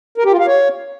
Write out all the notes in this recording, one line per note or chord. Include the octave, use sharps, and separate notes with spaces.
A#4
G4
F4
F5
C#5